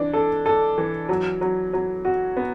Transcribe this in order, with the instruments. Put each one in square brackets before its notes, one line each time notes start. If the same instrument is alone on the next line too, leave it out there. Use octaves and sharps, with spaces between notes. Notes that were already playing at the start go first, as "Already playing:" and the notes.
Already playing: [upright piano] E3 D4
A4
A4
E3
F#3
F#3
F#3
F#4
B3